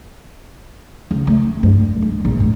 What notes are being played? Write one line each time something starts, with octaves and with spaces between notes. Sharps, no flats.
C#2
A3
G2
G#3
A#1
A2